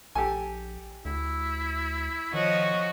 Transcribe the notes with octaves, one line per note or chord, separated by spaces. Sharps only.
A#1 G4 A4 G#5
D2 E4
D#3 F3 F#4 C#5 D#5